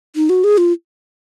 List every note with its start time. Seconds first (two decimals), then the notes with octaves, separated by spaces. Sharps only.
0.16 D#4
0.29 F#4
0.44 G#4
0.58 F4